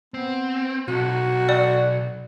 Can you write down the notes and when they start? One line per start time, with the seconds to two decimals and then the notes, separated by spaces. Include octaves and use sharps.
0.14 B3 C4
0.88 B1 F#4
1.49 D5